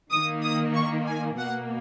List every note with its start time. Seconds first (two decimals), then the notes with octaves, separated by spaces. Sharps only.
0.11 D#3 A#3 D#6
0.42 D#6
0.74 C#6
1.07 G#5
1.38 B2 A#3 F#5